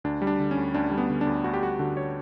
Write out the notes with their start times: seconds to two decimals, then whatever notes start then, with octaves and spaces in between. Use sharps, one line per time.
0.04 D2 D4
0.22 G3
0.27 D4
0.40 D3
0.51 C#4
0.57 D2
0.74 D2 D4
0.91 G3
0.98 B3
1.10 D3
1.21 D4
1.27 D2
1.44 D2 F#4
1.54 G4
1.63 G3 F#4
1.79 D3 F#4
1.97 C#5